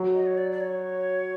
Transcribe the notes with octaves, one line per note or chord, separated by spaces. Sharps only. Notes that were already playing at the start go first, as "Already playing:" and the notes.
Already playing: F#3
D#5
C#5
D5
D5
C#5